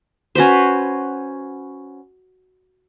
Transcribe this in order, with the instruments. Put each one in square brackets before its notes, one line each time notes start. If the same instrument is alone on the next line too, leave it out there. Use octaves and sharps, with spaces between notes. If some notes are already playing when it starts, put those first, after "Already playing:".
[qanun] C#4 F#4 B4 C5